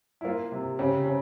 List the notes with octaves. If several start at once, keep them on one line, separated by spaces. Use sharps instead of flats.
E4
A#3 F4
C3
C#3 G4
C#3